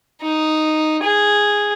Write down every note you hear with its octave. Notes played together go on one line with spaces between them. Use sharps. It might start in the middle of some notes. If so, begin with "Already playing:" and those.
D#4
G#4